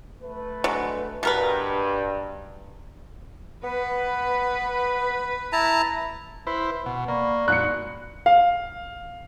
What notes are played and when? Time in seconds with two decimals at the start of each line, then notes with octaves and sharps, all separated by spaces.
0.22 A3 B4
0.64 D3 F#3 G#3
1.23 G2 B2 A#4 B4
3.64 B3 B4
5.53 E4 A5 A#5
6.47 E4 B4 C5
6.86 B2 F#5
7.08 A#3 D5 B5 C#6
7.48 A#2 F#6 C#7
8.26 F5